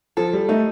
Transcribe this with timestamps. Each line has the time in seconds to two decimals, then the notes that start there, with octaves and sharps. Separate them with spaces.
0.17 F3 A4
0.33 G3
0.49 A3 D#4